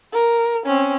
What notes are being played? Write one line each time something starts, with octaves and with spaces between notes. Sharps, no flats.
A#4
C4 C#4